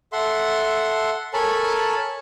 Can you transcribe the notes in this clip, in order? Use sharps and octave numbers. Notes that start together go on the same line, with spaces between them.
A4 E5 F#5 C6
A4 A#4 C#5 G#5 A5 B5